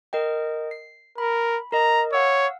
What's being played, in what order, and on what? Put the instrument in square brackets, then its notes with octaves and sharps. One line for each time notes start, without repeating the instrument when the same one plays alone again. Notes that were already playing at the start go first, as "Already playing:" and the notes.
[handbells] A#4 D#5 G5
C7
[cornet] A#4 [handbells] B5
[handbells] A#4 D#5 [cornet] A#5
[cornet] C#5 [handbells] F5 F#5 E6